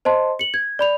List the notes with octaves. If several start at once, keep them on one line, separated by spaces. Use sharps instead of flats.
C5 D#5 A5 C6
C#7 F#7
G#6
D5 B5 F7